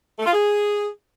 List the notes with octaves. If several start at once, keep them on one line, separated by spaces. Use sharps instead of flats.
A3
F4
G#4